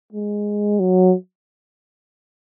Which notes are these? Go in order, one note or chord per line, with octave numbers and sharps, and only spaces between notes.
G#3
F#3